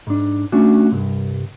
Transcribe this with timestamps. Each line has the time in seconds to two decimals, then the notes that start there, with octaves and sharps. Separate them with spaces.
0.07 G#2 D4
0.52 A3 C#4 D4 F#4
0.92 C2 G2